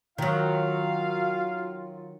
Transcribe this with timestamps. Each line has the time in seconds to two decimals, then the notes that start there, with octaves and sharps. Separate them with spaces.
0.18 D#3 F#3 F4 F#4 F5